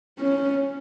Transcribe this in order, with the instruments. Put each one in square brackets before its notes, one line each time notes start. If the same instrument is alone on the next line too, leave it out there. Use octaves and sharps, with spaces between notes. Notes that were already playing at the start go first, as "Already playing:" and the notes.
[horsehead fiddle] C#4